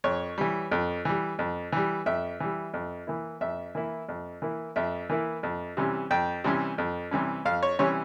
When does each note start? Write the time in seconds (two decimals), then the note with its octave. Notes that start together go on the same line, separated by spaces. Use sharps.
0.04 F2 C#5
0.38 E3 G3
0.72 F2
1.05 E3 G3
1.39 F2
1.72 E3 G3
2.06 F2 E5
2.40 E3 G3
2.74 F2
3.07 E3 A#3 E4
3.41 F2 E5
3.75 E3 A#3 E4
4.09 F2
4.42 E3 A#3 E4
4.76 F2 E5
5.10 E3 A#3 E4
5.43 F2
5.77 C3 E3 G3 C#4
6.11 F2 G5
6.44 C3 E3 G3 C#4
6.78 F2
7.11 C3 E3 G3 C#4
7.45 F2 F5
7.63 C#5
7.79 C3 E3 G3 C#4 C#5